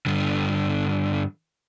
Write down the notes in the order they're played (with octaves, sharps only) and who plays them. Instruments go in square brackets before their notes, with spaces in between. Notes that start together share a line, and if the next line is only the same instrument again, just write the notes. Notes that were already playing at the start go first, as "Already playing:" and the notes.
[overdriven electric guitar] G2 D3